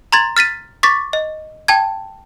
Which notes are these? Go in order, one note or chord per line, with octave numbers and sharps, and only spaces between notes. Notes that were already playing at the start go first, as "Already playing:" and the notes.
A#5 C6 G#6 A6
F6 A6 B6 D#7
C#6 D6 A6 B6
D#5
G5 A5 G#6